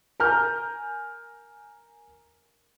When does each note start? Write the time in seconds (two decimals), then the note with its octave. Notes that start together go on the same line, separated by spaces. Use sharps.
0.20 A#4 G#5 A#5 F6 G6